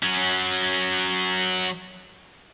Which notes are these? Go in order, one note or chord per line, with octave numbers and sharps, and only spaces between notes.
F#3 C#4